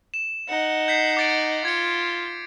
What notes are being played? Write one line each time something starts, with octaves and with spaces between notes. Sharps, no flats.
E7
D#4 F#5
G6 B6 C7
D6 A6 D7
F4 G#6 C#7